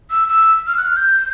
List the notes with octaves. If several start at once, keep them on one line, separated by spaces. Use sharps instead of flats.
E6
E6
F6
F#6
F6
G6